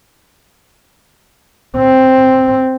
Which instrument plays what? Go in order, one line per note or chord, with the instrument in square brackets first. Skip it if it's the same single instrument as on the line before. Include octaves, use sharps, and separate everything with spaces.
[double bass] C4